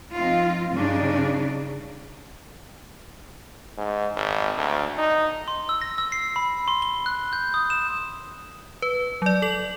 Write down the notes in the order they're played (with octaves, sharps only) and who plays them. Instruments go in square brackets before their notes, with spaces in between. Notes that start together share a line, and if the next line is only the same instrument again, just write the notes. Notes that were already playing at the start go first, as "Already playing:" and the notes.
[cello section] F3 C4 D#4 F4
G2 C#3 D4 D#4
[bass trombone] G#2
G#1
D2
D#4
[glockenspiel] C6
E6
A#6
E6
C7
B5
C6
G7
F#6
G6
D#6
E7
[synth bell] B4
F#3 D5
A4 F#7